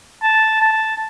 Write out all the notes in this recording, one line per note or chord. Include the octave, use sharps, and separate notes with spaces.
A5
A5